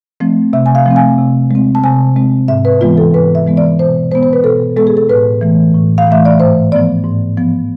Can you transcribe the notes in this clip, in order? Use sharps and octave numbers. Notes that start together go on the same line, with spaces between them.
F3 A3 C4
C3 E5
G#5
F5
F3 A3 C4
G#5
C3
G#3 C4
A5
C3 G#5
G#3 C4
G#2 E5
B4
E3 G#3 B3 F4
A4
G#2 B4
E5
E3 G#3 B3
D5
B2 C5
G#3 B3 C5
C5
B4
B2 A4
G#3 B3 A4
G#4
A4
A2 B4
E3 A3
A2
F5
E3 A3 E5
D5
G#2 C5
F3 B3 D5
G#2
F3 B3